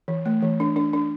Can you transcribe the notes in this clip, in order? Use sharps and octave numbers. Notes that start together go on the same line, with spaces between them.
E3
A3
E3
D4
D4
D4